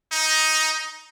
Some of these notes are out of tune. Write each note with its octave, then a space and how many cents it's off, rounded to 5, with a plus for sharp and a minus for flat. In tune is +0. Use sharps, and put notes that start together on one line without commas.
D#4 +10